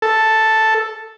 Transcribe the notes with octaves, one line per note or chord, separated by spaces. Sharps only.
A4